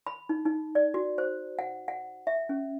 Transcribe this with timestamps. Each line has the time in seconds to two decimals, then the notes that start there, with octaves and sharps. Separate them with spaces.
0.07 B5
0.29 D#4
0.45 D#4
0.75 D5
0.94 F#4
1.18 C5
1.59 F#5
1.88 F#5
2.27 E5
2.49 C#4